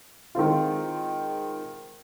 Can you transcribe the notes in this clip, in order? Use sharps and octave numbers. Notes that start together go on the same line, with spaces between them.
D#3 G#3 C4 F4